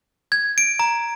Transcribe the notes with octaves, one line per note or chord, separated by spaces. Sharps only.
G#6
D7
A#5